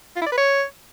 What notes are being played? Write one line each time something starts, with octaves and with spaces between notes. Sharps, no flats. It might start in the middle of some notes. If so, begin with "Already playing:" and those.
F4
E4
D5
B4
C#5